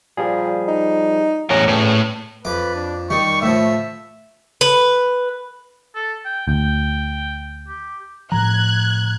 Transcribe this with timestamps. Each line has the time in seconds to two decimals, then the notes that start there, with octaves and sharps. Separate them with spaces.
0.17 A#2 F3 G3 G#4
0.68 D#4
1.50 E2 A2 C#4 A#4 F#5 A#6
1.68 E2 A2 C#4
2.45 F2 B4 D6
2.75 D4
3.10 D#3 G3 C#6
3.42 A2 F3 E5
4.61 B4
5.95 A4
6.25 G5
6.48 D2 G5
7.68 G4
8.32 A2 F3 A#5 F#6 G#6